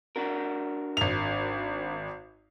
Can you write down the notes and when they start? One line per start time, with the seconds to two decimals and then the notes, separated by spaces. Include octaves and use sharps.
0.16 D4 F#4 A#4
0.97 G#1 F7